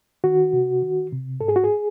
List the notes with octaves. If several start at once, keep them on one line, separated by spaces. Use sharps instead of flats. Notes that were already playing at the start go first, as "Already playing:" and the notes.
D#3 F#4
C3
D#3
C3
G#2 A4
G#4
F#4
G#4